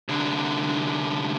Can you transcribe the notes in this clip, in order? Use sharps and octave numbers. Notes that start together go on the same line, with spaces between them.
C2 D3